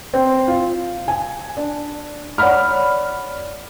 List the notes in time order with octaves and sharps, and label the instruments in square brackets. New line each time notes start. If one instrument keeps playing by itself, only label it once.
[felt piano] C4
F4
G#5
D4
C#5 D5 F#5 B5 F6